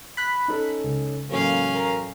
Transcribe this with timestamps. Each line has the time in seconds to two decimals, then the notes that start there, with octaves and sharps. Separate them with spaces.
0.17 B5 F#6 B6
0.48 C#4 D#4 A4
0.84 C#2
1.30 A1 F#3 A#3 C#4 A4 F5
1.74 A#4